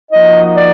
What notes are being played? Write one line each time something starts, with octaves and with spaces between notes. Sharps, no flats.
F3 A#3 D#4 F#4 D#5
D5